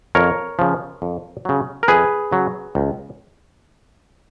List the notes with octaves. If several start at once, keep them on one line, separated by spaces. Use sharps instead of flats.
F2 A#4 C#5
C#3 F3
F2
C#3 F#3
A#4
F2 G#4 B4
C#3 F#3
C#2